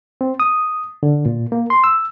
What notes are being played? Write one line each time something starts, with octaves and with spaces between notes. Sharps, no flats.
C4
D#6
D3
A#2
A#3
C6
E6